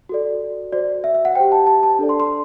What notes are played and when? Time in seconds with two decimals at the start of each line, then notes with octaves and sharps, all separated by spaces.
0.09 F#4 A4 D5
0.72 F#4 C5 D5
1.04 E5
1.14 E5
1.25 F#5
1.35 G4 C5 G5
1.52 A5
1.67 A5
1.83 A5
1.99 D4 A4 D5
2.09 C6
2.20 C6